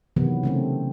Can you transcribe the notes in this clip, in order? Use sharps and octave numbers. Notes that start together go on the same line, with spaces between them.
C3 D#3 E3 F#3 B3
C#3 A3 C4